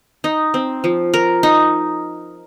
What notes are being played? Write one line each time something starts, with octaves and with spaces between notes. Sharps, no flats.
D#4
C4
F3
A#4
D#4